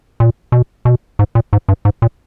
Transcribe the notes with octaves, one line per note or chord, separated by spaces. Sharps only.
A#2
B2
B2
G#2
A#2
G#2
G2
G#2
A#2